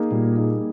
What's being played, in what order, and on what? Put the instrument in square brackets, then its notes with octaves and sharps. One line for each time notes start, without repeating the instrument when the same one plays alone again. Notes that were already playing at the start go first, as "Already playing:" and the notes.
Already playing: [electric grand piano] A#3 D#4 G#4
[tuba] A#2 [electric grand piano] G3
[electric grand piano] A#3 D#4 G#4